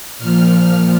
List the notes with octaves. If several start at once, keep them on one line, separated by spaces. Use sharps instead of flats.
A#2 F3 F6